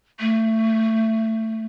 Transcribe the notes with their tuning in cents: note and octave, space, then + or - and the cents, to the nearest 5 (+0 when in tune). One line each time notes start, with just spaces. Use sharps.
A3 +20